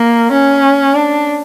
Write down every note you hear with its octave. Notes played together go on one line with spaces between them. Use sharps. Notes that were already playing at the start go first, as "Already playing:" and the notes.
Already playing: A#3
C#4
D4